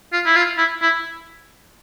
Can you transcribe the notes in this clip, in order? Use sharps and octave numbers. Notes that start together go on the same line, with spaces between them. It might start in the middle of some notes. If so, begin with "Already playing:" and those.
F4
E4
F4
E4
E4